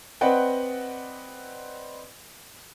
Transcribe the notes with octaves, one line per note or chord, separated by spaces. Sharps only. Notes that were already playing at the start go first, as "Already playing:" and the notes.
C4 B4 D5 D#5 F#5 G5